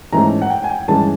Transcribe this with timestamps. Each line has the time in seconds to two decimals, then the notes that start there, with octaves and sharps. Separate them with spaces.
0.13 G#2 E3 A3 C#4 A#5
0.42 F#5
0.50 G5
0.64 G#5
0.70 G5
0.88 G2 E3 G#3 C#4 A5